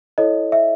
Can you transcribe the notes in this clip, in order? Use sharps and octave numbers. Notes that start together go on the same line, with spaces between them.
E4 A4 C#5 D#5
E5